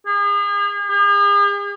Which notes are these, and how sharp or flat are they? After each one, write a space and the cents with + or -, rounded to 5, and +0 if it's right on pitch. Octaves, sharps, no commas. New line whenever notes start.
G#4 -40
G#4 -45